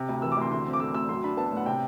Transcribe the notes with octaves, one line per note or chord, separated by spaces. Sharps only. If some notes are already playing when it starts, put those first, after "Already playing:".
Already playing: C3
D2
E3 E6
D6
D2 C6
D3 C6
C4
D6
A3 E6
D2 E6
F#3 C6
D4 B5
B3 A5
A2 F#5
C3 G5